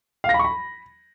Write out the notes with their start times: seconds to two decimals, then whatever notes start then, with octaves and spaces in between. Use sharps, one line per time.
0.24 F5
0.29 A#6
0.34 B5
0.39 C#6
0.45 B5